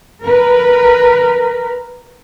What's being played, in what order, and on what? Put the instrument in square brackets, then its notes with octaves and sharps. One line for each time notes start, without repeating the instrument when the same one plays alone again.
[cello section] A#4 B4